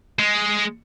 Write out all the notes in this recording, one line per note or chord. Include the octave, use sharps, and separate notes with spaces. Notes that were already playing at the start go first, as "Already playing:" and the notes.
G#3